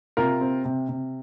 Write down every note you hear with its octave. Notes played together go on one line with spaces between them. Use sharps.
C3 F4 A#4
C4
C3
C3